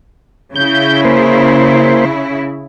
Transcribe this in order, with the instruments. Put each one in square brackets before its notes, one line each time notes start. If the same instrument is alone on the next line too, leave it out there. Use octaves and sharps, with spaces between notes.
[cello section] C#3 E4 [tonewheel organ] G6
[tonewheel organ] A#3 C5